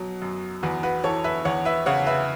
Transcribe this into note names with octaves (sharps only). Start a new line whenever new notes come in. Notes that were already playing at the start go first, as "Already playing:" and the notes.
Already playing: B2 F#3
F#2
E2 F#4 B4
F#4 B4
E3 A4 C#5
B4 E5
E2 C#5 F#5
B4 E5
C#3 C#5 F#5
B4 E5